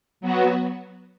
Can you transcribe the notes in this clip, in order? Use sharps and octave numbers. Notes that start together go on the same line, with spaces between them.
F#3 B3 F#4